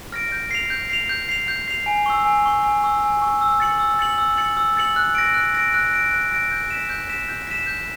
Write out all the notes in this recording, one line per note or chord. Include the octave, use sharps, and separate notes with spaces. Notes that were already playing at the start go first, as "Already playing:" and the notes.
F6 A#6 D7
G6
C7 F7
G6
C7 F7
G6
C7 F7
G6
C7 F7
G#5
C#6 E6
G#5
C#6 E6
G#5
C#6 E6
G#5
C#6 E6
E6
A6 C#7 F#7
E6
A6 C#7 F#7
E6
A6 C#7 F#7
E6
A6 C#7 F#7
F#6
A#6 D7
F#6
A#6 D7
F#6
A#6 D7
F#6
A#6 D7
G6
B6 E7
G6
B6 E7
G6
B6 E7
G6